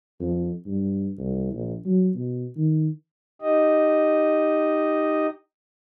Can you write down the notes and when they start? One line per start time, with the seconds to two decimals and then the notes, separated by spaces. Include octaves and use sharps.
0.20 F2
0.66 G2
1.18 C2
1.52 A#1
1.85 F#3
2.15 B2
2.56 D#3
3.41 D#4 G4 D#5